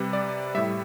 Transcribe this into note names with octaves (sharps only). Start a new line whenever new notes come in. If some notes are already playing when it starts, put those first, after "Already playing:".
Already playing: C3 G3 B4
D5
A2 G3 E5